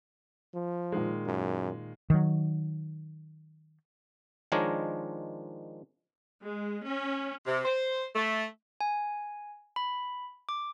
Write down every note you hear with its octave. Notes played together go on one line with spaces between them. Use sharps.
F3
A#2 D#3 G#3
F#2
D#3 F#3
D#3 F3 G#3 D4 A#4 C#5
G#3
C#4
C3
C5
A3
G#5
B5
D6